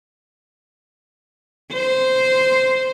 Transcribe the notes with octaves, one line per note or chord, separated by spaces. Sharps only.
C5